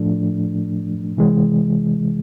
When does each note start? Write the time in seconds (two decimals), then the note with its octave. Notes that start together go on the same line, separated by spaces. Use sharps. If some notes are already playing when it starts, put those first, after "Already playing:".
Already playing: A2 F3 A3 D4
1.17 C3 E3 G#3